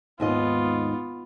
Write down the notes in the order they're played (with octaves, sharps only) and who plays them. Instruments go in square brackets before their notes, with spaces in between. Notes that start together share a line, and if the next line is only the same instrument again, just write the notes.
[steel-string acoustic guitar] D#2 G#2 D#5 [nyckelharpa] B3 F4